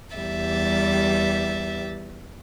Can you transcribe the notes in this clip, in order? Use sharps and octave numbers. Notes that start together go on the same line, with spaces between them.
E2 G3 G4 E5 A6